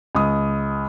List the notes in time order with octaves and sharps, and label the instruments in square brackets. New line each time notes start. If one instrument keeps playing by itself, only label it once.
[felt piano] C#2 D#6